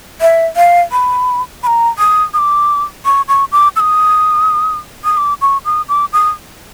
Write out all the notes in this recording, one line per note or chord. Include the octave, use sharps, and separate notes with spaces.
E5
F5
B5
B5
A#5
D#6
D#6
D6
C#6
C#6
D6
E6
D#6
D#6
D6
C#6
D#6
D6
D#6